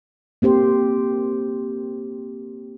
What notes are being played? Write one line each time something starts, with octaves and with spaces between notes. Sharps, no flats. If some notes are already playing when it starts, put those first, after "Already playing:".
A#3 C4 G4 C5